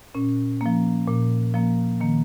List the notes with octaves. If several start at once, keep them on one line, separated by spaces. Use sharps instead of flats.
A#2 C#4
F3 A#3
A#2
F3 A#3
D#3 A#3